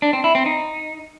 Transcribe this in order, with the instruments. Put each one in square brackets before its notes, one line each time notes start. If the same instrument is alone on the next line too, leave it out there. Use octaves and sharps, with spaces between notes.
[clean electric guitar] D4
C4
E4
C4
D#4